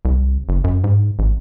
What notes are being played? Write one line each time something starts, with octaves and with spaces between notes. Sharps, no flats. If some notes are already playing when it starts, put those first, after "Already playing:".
C2
F#1
F#2
G#2
A1